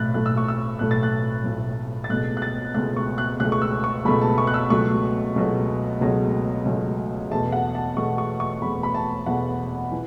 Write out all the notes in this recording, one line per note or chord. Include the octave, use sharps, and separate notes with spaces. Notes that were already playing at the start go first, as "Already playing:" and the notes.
Already playing: B1 A2 A3 F#6 A6
B1 A2 A3 F#6
E6
C#6
E6
B1 A2 A3 F#6
A6
F#6
B1 A2 A3
A6
C#2 B2 A3 F#6
F#6
A6
C#2 B2 A3 F#6
C#6
F#6
C#2 B2 A3 F#6
C#6
E6
C#6
C#2 B2 A3 B5
A5
C#6
F#6
E6
C#2 B2 F#3 A3 C#6
C#2 B2 F#3 A3
C#2 B2 F#3 A3
C#2 B2 F#3 A3
E2 B2 A3 A5
F#5
A5
E2 B2 A3 C#6
C#6
C#6
E2 B2 A3 B5
B5
A5
E2 B2 A3 F#5
E3